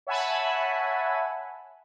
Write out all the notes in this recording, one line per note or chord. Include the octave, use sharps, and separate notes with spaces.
C#5 E5 F#5 G#5 A5 B5